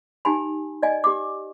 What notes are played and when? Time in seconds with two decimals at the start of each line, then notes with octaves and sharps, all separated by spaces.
0.25 D#4 G4 G#5 B5
0.83 D5 D#5 G#5
1.04 G4 D6